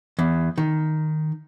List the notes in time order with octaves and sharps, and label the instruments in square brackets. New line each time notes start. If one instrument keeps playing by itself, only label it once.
[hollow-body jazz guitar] E2
D#3